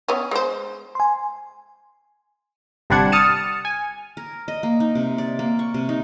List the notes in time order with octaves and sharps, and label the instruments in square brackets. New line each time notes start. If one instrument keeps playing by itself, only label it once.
[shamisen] B3 C#4
G#3 C5
[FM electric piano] G#5 C6
[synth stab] G1 C3 G3 D4 F#5 G#6
D#6 F6 A6 C#7 D#7 E7
G#5
[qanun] A#4
D#5
A#3
D#4
C3
D5
A#3
C#6
C3
D#4